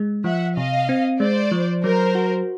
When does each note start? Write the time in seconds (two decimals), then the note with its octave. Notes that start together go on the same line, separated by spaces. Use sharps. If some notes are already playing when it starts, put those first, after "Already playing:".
Already playing: G#3
0.24 F3 E5 F#5
0.56 C3 D#5 F5
0.89 C4
1.20 G#3 C5 D5
1.51 F3
1.83 F#3 A#4 C5
2.15 F#4